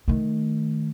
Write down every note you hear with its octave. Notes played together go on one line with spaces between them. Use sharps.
D#3 A3